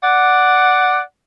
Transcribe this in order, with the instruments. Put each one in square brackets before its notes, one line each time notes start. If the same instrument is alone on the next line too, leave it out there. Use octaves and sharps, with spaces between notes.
[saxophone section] D5 F#5